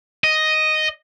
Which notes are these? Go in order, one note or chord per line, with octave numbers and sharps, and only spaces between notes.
D#5